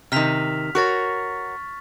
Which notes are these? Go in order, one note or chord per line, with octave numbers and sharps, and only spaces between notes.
C3 D#3 F6 B6 F7
F#4 A#4 C#5 C#6 A6